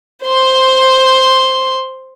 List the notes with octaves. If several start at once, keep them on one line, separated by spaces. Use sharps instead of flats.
C5 C6